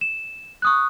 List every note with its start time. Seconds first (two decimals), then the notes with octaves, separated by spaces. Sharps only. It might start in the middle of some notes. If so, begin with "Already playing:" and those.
0.01 E7
0.62 C#6 D#6 F#6